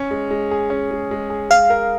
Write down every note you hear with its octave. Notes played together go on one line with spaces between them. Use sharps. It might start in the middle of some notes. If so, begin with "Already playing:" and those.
Already playing: C#4
G#3
G#3
G#4
C#4
G#3
G#3
G#4
G#3 F5
A#4